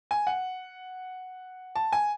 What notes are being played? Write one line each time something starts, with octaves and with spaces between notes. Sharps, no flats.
G#5
F#5
A5
G#5